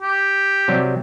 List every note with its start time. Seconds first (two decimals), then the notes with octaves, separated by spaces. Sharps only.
0.02 G4
0.68 C3 F#3 G3